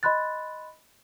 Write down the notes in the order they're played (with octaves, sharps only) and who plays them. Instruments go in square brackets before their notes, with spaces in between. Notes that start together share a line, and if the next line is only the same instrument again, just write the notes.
[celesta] D#5 B5 C6 F#6 A6